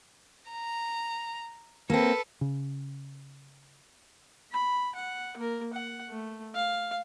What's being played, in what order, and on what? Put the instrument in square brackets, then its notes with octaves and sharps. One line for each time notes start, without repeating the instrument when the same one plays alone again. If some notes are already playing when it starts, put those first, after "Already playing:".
[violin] A#5
[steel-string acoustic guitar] A#3 C4 [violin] A4 B4
[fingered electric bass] C#3
[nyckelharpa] B5
F#5
A#3 A#4
F#5
A3
F5